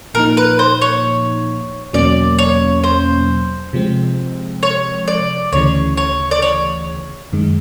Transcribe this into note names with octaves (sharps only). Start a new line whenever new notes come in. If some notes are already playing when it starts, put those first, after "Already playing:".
A#2 F3 A#3 D#4 A#4
B4
C5
C#5
E2 B2 F#3 A#3 C#4 D5
C#5
C5
C3 F3 G#3 C4
C#5
D5
D2 C#3 E3 C#5
C#5
D5
C#5
F#2 D#3 G#3